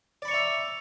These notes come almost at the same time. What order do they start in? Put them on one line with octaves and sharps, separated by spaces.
D5 B5 C#6 A#5 E5